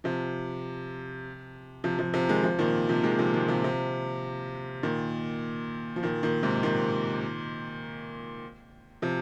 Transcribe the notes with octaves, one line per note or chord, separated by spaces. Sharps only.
C3 F3
C3 F3
C3 F3
C3 F3
D#3 G#3
C3 F3
A#2 D#3
C3 F3
D#3 G#3
C3 F3
D#3 G#3
C3 F3
C3 F3
A#2 D#3
F3
A#2 D#3
A#2 D#3
G#2 C3
A#2 D#3
C3 F3